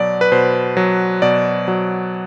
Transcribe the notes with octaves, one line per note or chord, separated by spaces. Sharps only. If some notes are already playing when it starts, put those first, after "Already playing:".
Already playing: B2 F#3 D5
B4
B2 C5
F#3
B2 D5
F#3